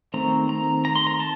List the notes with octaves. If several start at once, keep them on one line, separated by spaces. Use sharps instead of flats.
D#3 A3 C4 A#5
A#5
A#5
C6
A#5
A5